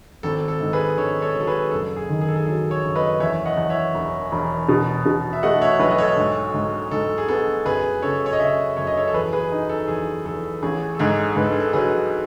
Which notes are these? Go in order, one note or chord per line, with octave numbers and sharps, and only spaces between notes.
G#1 A4
A4
G#2
G#4 B4
G#1 A4 C#5
A4 C#5
F#3
A4
G#4 B4
F#1 A4
G#4
D#3
G#4
A4
G#4
F#3 A4
A4 C#5
F#1
B4 D#5
E2 C#5 E5
D#5 F#5
E2
C#5 E5
E1
E1
B2
B2
E5
A3 D#5 F#5
C#5 E5
B1 B4 D#5
D#5
A4 C#5
G#2
G#2
G#2 A4
G#4
B3 A4
F#2 G#4 B4
C#3 A4 C#5
C#5
D#5
C#3 C#5 E5
F#2 C#5
D#5
A4 C#5
A4
E2 G#4 B4
G#4 B4
D#4
A4
E2 G#4
E2 A4
A1 G#4
A4
G#2 G#4
G#2 B4
A4
G#4
A4
F#3 G#4 B4